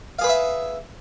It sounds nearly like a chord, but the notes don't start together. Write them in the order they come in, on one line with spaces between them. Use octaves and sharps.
F5 G#4 B4 C#6 E5